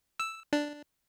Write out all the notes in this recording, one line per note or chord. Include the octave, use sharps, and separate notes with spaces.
E6
D4